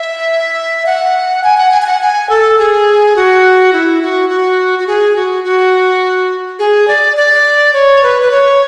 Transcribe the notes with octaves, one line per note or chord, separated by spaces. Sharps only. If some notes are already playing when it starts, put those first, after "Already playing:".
Already playing: E5
F#5
G#5
F#5
G#5
G#5
F#5
G#5
A4
G#4
F#4
E4
F#4
F#4
F#4
G#4
F#4
F#4
G#4
D5
D5
C#5
B4
B4
C#5